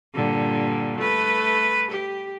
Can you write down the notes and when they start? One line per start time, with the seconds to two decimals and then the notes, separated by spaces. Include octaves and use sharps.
0.14 G2 A#2 D3
0.98 A3 B4
1.91 G4